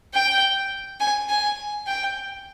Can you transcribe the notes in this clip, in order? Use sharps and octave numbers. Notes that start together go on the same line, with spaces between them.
G5
G#5
G#5
G5